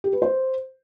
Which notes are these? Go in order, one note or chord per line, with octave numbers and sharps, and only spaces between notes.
G4
B4
C5